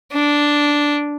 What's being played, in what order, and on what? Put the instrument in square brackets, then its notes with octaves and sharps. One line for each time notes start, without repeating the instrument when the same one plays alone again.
[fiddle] D4